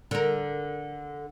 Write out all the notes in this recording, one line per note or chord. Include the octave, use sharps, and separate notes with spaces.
D3 A#4